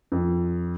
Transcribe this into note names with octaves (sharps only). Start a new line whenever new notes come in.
F2